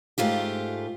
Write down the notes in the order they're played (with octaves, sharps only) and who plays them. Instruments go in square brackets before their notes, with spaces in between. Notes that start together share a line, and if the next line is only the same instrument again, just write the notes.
[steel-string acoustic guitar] G#2 A3 F4 G4